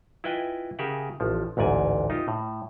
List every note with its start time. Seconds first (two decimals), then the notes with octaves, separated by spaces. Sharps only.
0.24 E4 F4 B4 D#5 G5 G#5
0.79 C#3 G4 G#4 A#4 E5 F#5
1.20 A1 F3
1.57 A1 D2 G#2 D5 G#5
2.10 D#4 F4 G4
2.28 A2